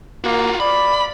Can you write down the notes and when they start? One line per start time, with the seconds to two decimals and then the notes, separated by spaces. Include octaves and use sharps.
0.24 A#3 F4 F#4
0.60 D5 B5